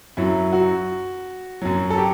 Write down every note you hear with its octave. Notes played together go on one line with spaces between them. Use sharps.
F#2 F#3 E4
F#4
F#2 F#3
A4
G4